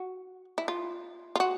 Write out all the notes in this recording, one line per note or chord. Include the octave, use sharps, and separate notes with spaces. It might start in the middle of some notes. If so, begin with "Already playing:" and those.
Already playing: F#4
E4
F4
F4
F#4